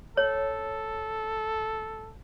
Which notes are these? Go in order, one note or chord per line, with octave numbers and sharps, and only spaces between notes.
A4 C#5